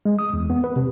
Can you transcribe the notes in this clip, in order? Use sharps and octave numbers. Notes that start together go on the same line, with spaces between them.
G#3
D#6
E2
B3
B4
C3